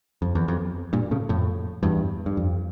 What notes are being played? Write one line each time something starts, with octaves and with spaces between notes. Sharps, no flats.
F2
E2
F2
G2 A#2
A2 C#3
F2 A2
E2 G2
G2
F2